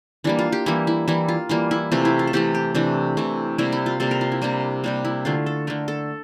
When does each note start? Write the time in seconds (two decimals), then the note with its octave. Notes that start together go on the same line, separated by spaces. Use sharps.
0.24 E3 G3 A#3 D4
0.39 F4
0.52 G4
0.66 E3 G3 A#3 E4
0.87 E4
1.08 E3 G3 A#3 E4
1.29 F4
1.49 E3 G3 A#3 F4
1.71 E4
1.92 C3 E3 A3 F4
2.05 E4
2.19 F4
2.27 A4
2.33 C3 E3 A3 G4
2.55 G4
2.75 C3 E3 A3 D4
3.17 C3 E3 A3
3.58 C3 G3 A#3 E4
3.72 E4
3.86 F4
4.00 C3 G3 A#3 A4
4.11 A#4
4.21 F4
4.32 E4
4.42 C3 G3 A#3 D4
4.84 C3 G3 A#3 D4
5.05 E4
5.25 D3 A3 F4
5.46 A4
5.67 D3 A3 A#4
5.88 A4